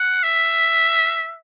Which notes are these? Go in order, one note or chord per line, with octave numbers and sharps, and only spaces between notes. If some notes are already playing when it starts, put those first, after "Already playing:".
Already playing: F#5
E5